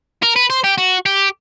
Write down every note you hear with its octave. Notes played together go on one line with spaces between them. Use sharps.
A#4
B4
C5
G4
F#4
G4